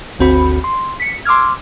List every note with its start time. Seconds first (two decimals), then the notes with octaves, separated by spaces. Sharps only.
0.19 G1 D2 C4 F#4 B5
0.64 C6
1.00 B6 C#7
1.25 C6 D6 E6 F6 G#6